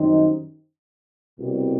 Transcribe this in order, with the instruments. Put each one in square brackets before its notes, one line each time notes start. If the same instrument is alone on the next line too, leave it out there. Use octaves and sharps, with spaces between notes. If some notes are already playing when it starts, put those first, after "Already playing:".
Already playing: [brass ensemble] F#2 D#3 G3 C4 D#4
C2 B2 G3